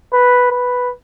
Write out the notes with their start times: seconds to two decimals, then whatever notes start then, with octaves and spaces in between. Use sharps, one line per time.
0.13 B4
0.51 B4